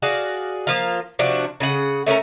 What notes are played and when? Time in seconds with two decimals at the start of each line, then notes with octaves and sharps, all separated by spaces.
0.02 F#4 G#4 D5 F5
0.67 F3 A#3 F4 F5
1.19 C3 F3 D4 F#4
1.60 C#3 G#4 F#5
2.07 A3 C#4 D4 A#4